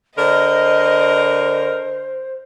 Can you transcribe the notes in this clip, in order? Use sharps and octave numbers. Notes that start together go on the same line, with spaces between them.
D3 A#4 C5 D#5